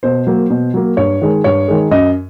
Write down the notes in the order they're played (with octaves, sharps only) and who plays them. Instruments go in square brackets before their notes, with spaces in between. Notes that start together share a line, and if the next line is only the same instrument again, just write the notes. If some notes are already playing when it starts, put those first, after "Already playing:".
[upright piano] B2 C5
F#3 A#3
B2
F#3 A#3
G2 C#5
D#3 G#3
G2 C#5
D#3 G#3
F#2 D#5